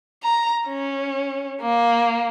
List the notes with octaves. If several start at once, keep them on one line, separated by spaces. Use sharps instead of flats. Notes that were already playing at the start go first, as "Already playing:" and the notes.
A#5
C#4
A#3